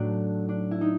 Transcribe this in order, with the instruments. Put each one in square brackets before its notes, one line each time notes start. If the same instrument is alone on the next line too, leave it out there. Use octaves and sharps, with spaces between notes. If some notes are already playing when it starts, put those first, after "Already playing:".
Already playing: [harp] A2 F#3 A3 D4
D4
E4
D#4